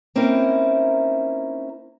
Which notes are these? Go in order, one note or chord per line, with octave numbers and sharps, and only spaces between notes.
A#3 C4 C#4 D#4 E4 A#4